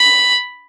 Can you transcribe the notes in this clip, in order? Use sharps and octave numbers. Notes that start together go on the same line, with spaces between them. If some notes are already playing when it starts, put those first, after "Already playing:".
Already playing: B5